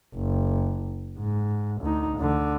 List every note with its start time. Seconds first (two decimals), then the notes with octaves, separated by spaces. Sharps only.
0.15 F#1
1.19 G#2
1.82 D2 D#4
2.17 D2 D3